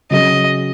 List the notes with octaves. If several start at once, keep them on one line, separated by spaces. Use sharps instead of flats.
C#3 F#3 C#4 G#4 D#5